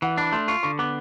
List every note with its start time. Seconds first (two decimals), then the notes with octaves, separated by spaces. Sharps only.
0.02 E3 F#5
0.18 D4 B5
0.32 A3 C6
0.48 F4 C#6
0.63 D3 C#6
0.79 B3 D6